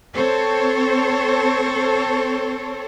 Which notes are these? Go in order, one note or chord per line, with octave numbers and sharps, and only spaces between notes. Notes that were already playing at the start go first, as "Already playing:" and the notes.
C4 A4 C5 C#5